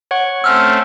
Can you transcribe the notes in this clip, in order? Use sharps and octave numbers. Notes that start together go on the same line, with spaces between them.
C#5 F#5 C#6
A3 C4 C#4 F#5 E6 F6